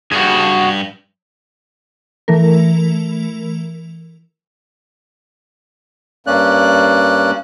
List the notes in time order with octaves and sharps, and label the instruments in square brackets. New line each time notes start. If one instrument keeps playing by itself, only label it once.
[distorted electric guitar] G2 [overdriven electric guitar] F#4 G#4
[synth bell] E3 A3 A#4
[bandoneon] G2 A#3 C#4 D5 F#6